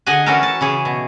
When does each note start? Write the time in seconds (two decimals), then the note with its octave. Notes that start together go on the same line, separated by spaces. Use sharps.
0.06 D3 G#4 D#5 F#5 G#5
0.26 E3 C#4 F#4 A4 A#4
0.43 A5
0.61 C#3 E3 G#4
0.85 B2